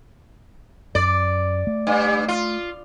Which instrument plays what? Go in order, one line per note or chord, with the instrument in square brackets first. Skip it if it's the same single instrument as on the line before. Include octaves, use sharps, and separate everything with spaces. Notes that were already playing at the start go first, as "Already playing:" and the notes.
[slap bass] F#2 [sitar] D5
[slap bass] A3
[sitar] G2
F4